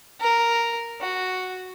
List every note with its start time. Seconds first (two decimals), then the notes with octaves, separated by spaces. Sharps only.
0.20 A#4
1.01 F#4